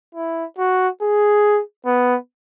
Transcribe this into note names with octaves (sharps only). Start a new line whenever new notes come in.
E4
F#4
G#4
B3